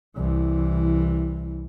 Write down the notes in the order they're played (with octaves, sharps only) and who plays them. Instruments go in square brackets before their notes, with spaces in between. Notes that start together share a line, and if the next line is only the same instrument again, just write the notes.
[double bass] C2 E3